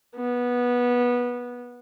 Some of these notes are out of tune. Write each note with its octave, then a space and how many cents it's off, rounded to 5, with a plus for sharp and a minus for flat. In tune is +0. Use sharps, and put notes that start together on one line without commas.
B3 -15